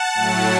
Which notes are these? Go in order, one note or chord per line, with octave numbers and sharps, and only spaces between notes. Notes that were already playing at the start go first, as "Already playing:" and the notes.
Already playing: F#5 A5
A2 F#3 A3